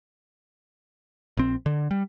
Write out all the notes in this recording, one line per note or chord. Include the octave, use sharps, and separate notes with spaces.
A#1 C4
D3
G3